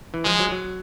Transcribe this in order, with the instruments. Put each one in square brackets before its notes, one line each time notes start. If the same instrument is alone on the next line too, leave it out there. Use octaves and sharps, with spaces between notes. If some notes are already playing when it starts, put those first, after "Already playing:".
[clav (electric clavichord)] E3
[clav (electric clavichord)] F3 [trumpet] G#3
[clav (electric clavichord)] F#3
F#3